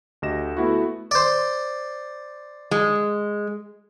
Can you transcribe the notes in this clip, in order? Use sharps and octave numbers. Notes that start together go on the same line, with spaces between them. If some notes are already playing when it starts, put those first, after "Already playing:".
D2 F#4 G4 D#5 A#6 E7
A3 B3 E4 F#4
C5 D5
G#3